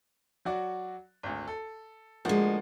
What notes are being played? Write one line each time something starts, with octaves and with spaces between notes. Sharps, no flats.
F#3 F#4 D5
G#1 D2
A4
D2 F3 G#3 A#3 F#4